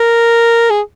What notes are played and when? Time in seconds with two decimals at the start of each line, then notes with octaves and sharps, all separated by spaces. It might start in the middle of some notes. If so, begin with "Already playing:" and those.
Already playing: A#4
0.70 G#4